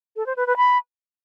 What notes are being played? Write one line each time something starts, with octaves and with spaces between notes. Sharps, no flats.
A4
C5
B4
B4
B5